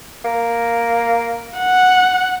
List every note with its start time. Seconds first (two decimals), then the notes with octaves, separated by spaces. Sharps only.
0.25 A#3
1.59 F#5